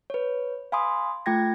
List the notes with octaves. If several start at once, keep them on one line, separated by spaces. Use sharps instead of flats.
B4 C#5
F5 G#5 B5 C6 D#6
A3 F4 G5 G#6 A#6